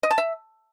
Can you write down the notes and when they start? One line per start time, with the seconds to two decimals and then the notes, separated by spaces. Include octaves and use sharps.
0.03 D#5
0.11 A5
0.18 E5